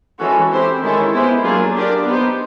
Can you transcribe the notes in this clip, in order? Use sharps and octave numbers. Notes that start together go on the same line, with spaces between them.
E3 G#3 C#4 F#4 A4
C4 E4 G4 C5
D#3 G#3 C#4 E4 A4
G#3 B3 E4 G4 C5
F#3 A#3 D4 F4 G#4
D4 G4 A#4 D5
B3 D#4 G4 C5